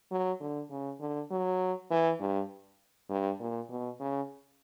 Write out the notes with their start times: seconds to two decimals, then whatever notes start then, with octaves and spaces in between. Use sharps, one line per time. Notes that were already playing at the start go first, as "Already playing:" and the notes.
0.11 F#3
0.40 D3
0.70 C#3
1.00 D3
1.31 F#3
1.90 E3
2.20 G2
3.09 G2
3.39 A#2
3.70 B2
4.00 C#3